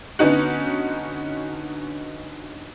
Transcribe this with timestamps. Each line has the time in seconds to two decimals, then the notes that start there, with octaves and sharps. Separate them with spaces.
0.19 D3 B3 C#4 D#4 F#4